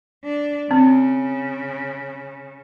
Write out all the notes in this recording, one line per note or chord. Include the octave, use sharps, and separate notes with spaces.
D4
C#3 C4